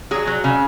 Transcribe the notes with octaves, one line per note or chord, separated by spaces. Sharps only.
F#3 G#4
F#3
C#3